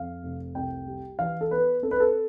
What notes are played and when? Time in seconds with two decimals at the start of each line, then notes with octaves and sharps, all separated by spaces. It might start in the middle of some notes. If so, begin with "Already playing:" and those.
Already playing: F2 F5
0.23 F1
0.55 C2 G5
0.87 G3
1.19 E3 F5
1.41 A4
1.51 B3 B4
1.83 C4 A4
1.91 B4
2.00 A4